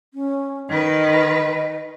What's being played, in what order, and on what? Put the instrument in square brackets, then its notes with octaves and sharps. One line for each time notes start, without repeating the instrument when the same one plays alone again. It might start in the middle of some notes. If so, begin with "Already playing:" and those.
[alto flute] C#4
[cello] D#3 B4 [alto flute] D#5